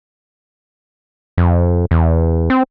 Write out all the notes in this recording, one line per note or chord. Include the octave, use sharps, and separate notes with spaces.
F2
E2
C4